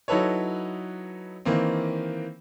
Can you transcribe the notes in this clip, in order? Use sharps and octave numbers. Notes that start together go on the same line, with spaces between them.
F#3 D#4 E4 A4 B4 C#5
D#3 E3 A#3 C4